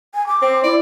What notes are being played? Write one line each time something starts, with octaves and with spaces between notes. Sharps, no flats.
G#5
D6
C4
E4 D5